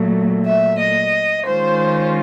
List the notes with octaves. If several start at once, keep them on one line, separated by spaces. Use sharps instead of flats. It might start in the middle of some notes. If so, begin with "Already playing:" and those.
Already playing: A#2 F#3 A3
E5
D#5
D#3 G#3 C#4 F4 C5